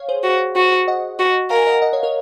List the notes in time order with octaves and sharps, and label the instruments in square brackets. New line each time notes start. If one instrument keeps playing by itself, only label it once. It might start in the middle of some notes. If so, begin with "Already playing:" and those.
Already playing: [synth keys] C#5 F5
G#4 C5
[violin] F#4
F#4
[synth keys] D#5 F#5
[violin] F#4
[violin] A#4 [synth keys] F5 G#5
[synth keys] D#5 F#5
D#5 F#5
C#5 F5
A#4 C#5